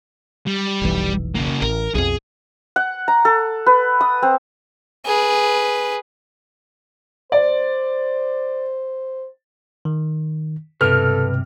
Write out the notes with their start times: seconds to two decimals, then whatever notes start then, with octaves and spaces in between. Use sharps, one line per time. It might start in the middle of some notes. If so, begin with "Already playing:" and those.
0.47 G3
0.81 F1 B1 E3
1.35 C#3 A#3
1.62 A1 A#4
1.95 B1 F2 G#4
2.76 F#5
3.08 A#5
3.25 A4
3.67 B4
4.01 D#6
4.23 C4
5.06 G#4 B4
7.32 C5 D5
9.85 D#3
10.81 B1 G2 C3 A4 B4 F6